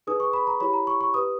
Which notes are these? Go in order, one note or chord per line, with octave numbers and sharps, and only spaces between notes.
D#4 G#4 B4 D#6
C#6
B5
A#5
E4 G4 C#5 B5
A#5
C#6
C#6
G4 B4 D#6